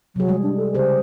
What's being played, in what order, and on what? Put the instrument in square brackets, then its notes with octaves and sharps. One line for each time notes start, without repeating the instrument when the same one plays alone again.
[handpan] C3 G#4 [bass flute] F#3
[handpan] E3 G3 G#3
[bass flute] D4
A4
[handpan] C#3 G4 G#4 [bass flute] C5